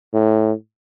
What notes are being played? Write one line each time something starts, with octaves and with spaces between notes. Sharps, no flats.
A2